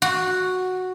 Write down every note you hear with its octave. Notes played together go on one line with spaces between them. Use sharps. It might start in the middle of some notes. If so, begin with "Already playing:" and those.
F#4